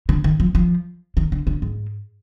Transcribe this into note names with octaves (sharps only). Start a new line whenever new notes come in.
D3
D#3
F3
F3
D#3
D3
D3
G#2